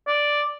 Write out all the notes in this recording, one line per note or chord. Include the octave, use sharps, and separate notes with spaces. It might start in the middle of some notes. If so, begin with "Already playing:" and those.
D5